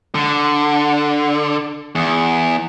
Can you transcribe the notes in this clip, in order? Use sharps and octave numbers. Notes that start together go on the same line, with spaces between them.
D3
E2